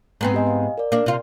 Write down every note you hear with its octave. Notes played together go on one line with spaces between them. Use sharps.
G#2 B3 C4 A#5
G4 D#5 G#5
F5
A#4 D5
A#3 D4
C3 F4